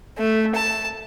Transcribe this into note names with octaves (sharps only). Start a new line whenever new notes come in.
A3
A5